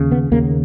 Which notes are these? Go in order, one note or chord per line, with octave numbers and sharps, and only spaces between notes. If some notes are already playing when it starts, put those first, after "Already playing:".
Already playing: D#2 C#3
B3
D#2 C#3 A#3